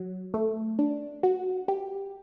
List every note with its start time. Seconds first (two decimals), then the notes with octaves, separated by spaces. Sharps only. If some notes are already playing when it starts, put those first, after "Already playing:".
Already playing: F#3
0.34 A3
0.79 D4
1.23 F#4
1.68 G4